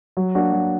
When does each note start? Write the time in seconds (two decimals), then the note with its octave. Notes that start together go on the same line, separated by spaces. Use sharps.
0.17 F#3
0.35 A#3 D4 F#4
0.53 F#3